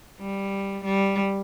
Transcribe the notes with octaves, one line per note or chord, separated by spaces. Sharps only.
G3
G3